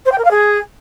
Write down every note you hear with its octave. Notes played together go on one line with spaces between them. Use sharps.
C5
G5
A#4
F5
G#4